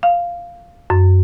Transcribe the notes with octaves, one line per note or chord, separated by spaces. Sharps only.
F5
F#2